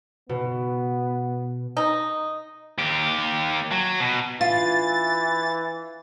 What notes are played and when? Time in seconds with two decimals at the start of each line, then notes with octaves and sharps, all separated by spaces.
0.29 B2 B3
1.77 D#4
2.78 D#2 G4
3.71 F#3
4.00 B2
4.41 E3 F4 A6